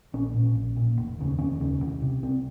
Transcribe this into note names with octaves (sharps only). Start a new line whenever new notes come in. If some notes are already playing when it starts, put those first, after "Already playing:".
A#1 C#4
A#2
A#1
A#2
F1
D#2 C#3
F1 C#4
D#2 C#3
C2
C3
C2 C4